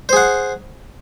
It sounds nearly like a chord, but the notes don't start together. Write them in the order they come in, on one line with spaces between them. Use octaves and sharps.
C5 G#4 F#5